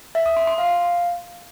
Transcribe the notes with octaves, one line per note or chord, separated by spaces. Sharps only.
E5
D#6
C6
C6
F5